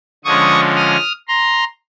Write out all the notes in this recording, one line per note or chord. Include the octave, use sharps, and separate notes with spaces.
D3 F3 G#3 C#4 C#6 D#6
D#6 F6
A#5 C6